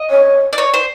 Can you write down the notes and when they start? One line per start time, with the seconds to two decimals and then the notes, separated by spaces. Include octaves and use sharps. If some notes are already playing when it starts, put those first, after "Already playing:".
Already playing: D#5
0.10 C#5
0.53 D5
0.58 C#5
0.74 C5